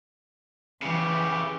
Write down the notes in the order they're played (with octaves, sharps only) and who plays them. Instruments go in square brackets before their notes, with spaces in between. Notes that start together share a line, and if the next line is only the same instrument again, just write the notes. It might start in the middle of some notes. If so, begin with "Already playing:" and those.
[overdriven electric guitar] C#3 G4 [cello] E3